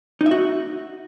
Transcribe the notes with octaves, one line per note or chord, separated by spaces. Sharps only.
D#4
E5
F#4